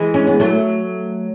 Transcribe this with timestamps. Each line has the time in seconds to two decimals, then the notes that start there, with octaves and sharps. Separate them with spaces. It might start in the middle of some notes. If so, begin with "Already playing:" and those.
Already playing: E3 G#3
0.14 C#4
0.27 B3
0.39 F#3 A3